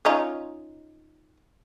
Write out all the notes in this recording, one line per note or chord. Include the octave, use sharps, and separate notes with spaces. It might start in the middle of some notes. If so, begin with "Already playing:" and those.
C#4 D#4 F4